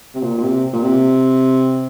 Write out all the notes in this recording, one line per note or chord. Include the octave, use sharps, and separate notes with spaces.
C3
A#2
A#2
C3
A#2
C3